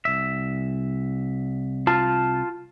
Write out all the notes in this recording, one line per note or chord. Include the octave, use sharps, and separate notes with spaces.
C2 E5
F4 A5